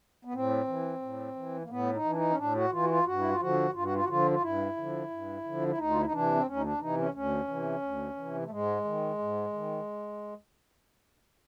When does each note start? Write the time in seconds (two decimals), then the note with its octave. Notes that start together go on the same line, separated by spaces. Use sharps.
0.25 B3
0.34 A2 C4
0.67 E3
1.02 A2
1.36 E3
1.64 A#3
1.70 A2 B3
1.93 D#4
2.04 E3
2.11 D4
2.15 D#4
2.30 C#4
2.38 A2 D4
2.55 F#4
2.71 E3 F4
2.83 F#4
2.89 F4
3.05 G2 F#4
3.19 E4
3.30 F4
3.40 D3 F3 F#4
3.74 G2 F4
3.84 F#4
3.94 F4
4.03 F#4
4.08 D3 F3 F4
4.31 F4
4.42 G2 E4
4.76 D3 F3
5.10 G2
5.44 D3 F3
5.68 E4
5.78 D2 D#4
5.90 F4
5.98 E4
6.06 D#4
6.12 C3 E3 D4
6.34 C4
6.46 D2 C#4
6.56 D#4
6.64 D4
6.80 C3 E3 D#4
6.98 C#4
7.14 D2 C#4
7.48 C3 E3
7.82 D2
8.16 C3 E3
8.45 A3
8.50 G#2 G#3
8.84 D#3
9.19 G#2
9.53 D#3